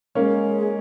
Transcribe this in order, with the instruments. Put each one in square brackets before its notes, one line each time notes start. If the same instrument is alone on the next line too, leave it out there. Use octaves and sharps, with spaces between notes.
[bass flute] G#3 [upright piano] A#3 C#4